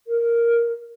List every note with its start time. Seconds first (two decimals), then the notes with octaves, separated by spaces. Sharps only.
0.07 A#4